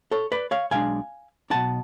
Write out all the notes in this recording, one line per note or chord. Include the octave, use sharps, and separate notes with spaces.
A4 C#5
B4 D5
C#5 F5
B1 B2 G#3 D4 F5 G#5
B1 B2 G#3 D4 F#5 A5